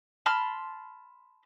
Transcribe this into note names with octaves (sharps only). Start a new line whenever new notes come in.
A5 B5 C6 F6